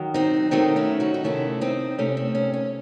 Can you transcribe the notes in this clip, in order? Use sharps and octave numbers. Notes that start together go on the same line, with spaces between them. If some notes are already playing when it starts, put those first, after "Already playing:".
Already playing: D#3 F#3
C4 D#4
D#3 F#3 A3 C4 D#4
C#4 E4
D#4 F#4
D#4
C3 D#3 A3 C#4 E4
C4 D#4
C3 D#3 A3 C#4
C4
C#4
C#4